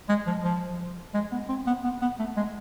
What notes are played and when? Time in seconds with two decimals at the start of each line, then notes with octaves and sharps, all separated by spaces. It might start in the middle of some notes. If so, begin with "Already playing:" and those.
0.09 G#3
0.26 F3
0.44 F3
1.14 G#3
1.32 B3
1.49 C4
1.67 B3
1.84 B3
2.01 B3
2.19 A3
2.36 G#3